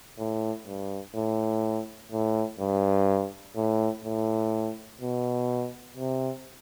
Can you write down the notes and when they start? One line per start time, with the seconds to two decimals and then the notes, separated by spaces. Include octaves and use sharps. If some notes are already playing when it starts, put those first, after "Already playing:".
0.18 A2
0.66 G2
1.14 A2
2.11 A2
2.59 G2
3.56 A2
4.04 A2
5.01 B2
5.97 C3